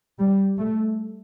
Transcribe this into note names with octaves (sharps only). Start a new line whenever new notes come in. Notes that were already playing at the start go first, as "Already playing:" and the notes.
G3
A3